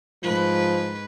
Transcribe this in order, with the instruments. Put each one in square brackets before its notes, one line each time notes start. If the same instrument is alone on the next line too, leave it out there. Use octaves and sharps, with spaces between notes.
[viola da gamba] G#2 B4 [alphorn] F3